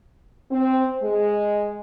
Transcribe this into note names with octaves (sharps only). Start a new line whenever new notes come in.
C4
G#3